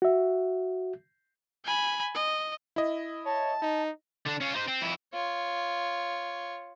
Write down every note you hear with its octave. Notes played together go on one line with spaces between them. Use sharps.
F#4 E5
G#5 B5
D#5
E4 D#5
C#5 A5
D#4
D3 D4
C#4 F4
D#4 C5
C4
F2 E4
F4 C#5